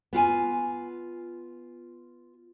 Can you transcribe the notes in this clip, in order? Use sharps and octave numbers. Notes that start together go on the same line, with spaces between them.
B3 F4 G5 G#5